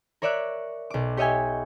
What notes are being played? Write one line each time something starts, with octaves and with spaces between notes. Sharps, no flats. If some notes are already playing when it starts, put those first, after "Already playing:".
A#4 C#5 D5 E5 D6 F#6
B1 D6
G4 C#5 D#5 E5 G5 G#5